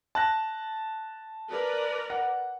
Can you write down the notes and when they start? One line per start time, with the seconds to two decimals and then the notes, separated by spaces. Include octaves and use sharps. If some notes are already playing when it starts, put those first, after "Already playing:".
0.15 A5 F#6 A#6
1.51 A#4 B4 D5
2.10 F#5